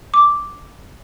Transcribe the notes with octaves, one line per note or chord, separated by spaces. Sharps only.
D6